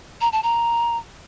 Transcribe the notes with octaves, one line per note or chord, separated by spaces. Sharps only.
A#5
A5
A#5